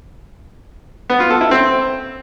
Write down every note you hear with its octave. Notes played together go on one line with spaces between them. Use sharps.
B3
F4
A4
E4
C4